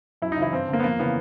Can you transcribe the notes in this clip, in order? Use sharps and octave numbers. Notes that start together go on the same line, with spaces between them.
F#2 E4
D#4
C#3 E3 E4
G2 C4
D3 A#3
B3
F2 A#3
C#3 E3 B3